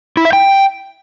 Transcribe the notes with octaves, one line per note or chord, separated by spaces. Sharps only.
E4
E5
G5